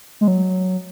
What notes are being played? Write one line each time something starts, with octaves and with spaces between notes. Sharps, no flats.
G#3
F#3